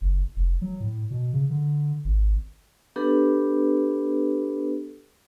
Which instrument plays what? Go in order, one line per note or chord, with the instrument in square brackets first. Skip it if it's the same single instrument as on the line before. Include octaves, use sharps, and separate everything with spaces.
[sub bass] F#1
F1
F#3
A2
B2
C#3
D3
G#1
[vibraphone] B3 D4 G4 A4 B4